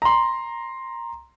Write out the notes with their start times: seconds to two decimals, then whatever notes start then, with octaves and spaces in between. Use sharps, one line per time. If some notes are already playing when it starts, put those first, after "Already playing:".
0.02 A#5 C6